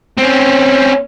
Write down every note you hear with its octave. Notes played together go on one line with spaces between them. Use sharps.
C4 C#4